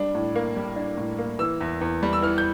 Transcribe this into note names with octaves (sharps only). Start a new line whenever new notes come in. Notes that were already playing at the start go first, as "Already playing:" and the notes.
Already playing: G3 D4
A2
A#3
G3
D4
A2
A#3
E3 E6
E2
E2
G3
E6
E3 F6
G6